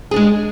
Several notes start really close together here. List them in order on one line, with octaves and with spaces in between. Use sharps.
G#4 D4 G#3